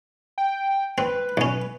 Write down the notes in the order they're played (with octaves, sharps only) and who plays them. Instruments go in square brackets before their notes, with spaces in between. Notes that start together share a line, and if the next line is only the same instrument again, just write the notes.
[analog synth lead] G5
[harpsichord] C4 [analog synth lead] B4
[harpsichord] B1 C#4